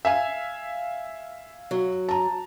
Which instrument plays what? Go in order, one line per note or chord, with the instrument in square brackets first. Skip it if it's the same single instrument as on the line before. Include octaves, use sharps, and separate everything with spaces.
[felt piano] E5 F5 G#5
[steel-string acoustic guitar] F#3
[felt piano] A5 A#5